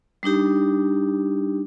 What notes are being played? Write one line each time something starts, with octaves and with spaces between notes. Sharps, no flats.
G3 D4 D#4 G4